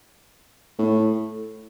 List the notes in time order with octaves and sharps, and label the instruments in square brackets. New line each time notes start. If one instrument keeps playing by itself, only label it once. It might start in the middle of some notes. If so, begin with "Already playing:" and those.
[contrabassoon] A2